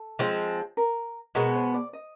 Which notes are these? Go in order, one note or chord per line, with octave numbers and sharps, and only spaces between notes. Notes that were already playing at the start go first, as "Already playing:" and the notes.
Already playing: A4
F3 G#3 C4
A#4
B2 G#3 B3 A#4
C5
D5
D#5